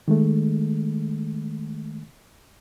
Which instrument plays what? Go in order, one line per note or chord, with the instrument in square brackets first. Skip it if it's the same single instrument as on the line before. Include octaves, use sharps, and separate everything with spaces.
[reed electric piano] D#3 G#3 A3